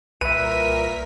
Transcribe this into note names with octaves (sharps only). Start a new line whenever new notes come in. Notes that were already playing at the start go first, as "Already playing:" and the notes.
C2 A#2 A#4 B4 E5 B6 D#7